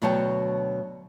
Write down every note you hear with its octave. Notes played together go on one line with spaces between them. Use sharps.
D2 B2 F#3 C#5 G5 A5